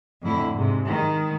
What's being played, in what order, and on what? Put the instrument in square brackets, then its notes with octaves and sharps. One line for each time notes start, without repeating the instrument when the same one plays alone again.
[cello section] F2 A2 D3 E4
G#2 C3
D#3 G#3